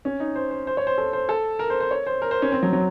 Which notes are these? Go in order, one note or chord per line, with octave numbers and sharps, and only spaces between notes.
C#4
D#4
C5
C5
C5
C#5
C5
A4
C5
A4
A#4
C5
C5
C#5
C5
A#4
C5
C#4
C4
F#3
F#3